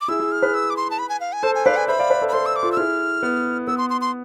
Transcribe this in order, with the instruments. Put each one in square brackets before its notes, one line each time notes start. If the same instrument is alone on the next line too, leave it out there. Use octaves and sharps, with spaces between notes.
[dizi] D6
[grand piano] E4 G#4 [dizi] E6
[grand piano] E4 G#4
[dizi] F6
[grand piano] G#4 B4
[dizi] E6
D6
C6
A5
B5
G#5
F5
G#5
[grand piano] A4 C5 [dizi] A5
[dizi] G#5
[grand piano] B4 D5 [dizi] F5
[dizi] G#5
[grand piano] C5 E5 [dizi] B5
[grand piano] D5 F5
B4 D5
A4 C5
[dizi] B5
[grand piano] A4 C5 [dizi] C6
[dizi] E6
D6
[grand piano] F4 A4
[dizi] E6
[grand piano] E4 G#4 [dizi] F6
[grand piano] B3
[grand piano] B3 [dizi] E6
[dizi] C6
C6
C6